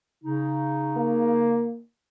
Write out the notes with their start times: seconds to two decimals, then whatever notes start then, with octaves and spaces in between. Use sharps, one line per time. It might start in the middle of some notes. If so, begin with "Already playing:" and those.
0.24 C#3 D#4
0.97 A#3